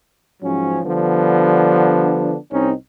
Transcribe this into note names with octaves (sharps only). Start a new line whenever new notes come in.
G#2 F3 F#3 C#4
D3 F3 G3 B3 D4
C2 C4 C#4 D#4